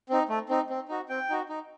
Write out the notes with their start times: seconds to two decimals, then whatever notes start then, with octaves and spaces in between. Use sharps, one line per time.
0.09 C4 D#4
0.29 A3
0.49 C4 D#4
0.70 C4
0.88 D#4 F#4
1.09 C4 G5
1.29 D#4 F#4
1.49 D#4